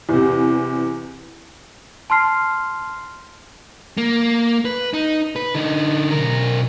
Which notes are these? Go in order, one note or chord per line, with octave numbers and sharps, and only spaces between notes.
E2 C3
A5 C6 F6 C7
A#3
B4
D#4
B4
D3 D#4
B1 A#4